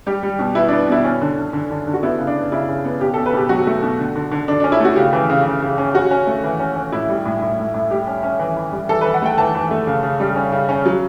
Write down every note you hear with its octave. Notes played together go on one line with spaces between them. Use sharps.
G3 G4
G3
B2
B3 E4
B3 D4
B2 E4
C#4
D3
D3
D3
D3
D3
F#4
B3 E4
C#3
D4
B3
C#3 E4
C#3
B3
B2 G4
B2 A4
B4
B2 G4
F#3 F#4
A3
B2
D3
D3
D3
D3 D4
C#4 D4
E4
A3 F#4
C#3 G4
E3
C#3
C#3
C#3
C#4
C#4 F#4
C#4
A3
E3
C#4
C#4
A2 E4
G3
A2
A2
A2
A2
G3 G4
C#4
C#4
E3
E3
G3
E3 A4
E3 B4
F#5
A3 G5
E3 A5
E3
A3
C#3
C#3
G3
C#4
C#3
C#4
F#3